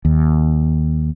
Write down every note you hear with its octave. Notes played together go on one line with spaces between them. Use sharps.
D#2